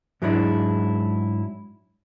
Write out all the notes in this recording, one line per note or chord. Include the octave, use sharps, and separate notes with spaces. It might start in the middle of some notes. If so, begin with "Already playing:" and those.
G#2 F#3 G#3 D4 E4